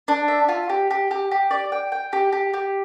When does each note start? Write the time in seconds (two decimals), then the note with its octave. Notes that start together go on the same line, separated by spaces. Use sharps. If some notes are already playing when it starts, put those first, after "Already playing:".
0.08 D4
0.28 E5
0.49 F4
0.69 G4
0.91 G4
1.11 G4
1.31 G4
1.51 D5
1.72 G5
1.92 G5
2.13 G4
2.32 G4
2.54 G4